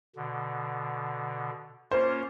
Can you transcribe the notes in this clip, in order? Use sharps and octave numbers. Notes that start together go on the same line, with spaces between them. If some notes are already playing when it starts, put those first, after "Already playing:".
B2 D3
A#3 C#4 F4 C5